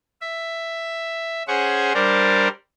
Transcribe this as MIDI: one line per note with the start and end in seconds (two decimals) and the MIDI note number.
0.21 1.43 76
1.48 1.93 61
1.48 1.93 68
1.48 1.93 72
1.48 1.93 78
1.48 1.93 85
1.94 2.48 55
1.94 2.48 62
1.94 2.48 70
1.94 2.48 72
1.94 2.48 74